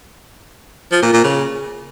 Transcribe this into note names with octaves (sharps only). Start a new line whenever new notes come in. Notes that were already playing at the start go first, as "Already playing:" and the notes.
F3
A#2
A#2
C#3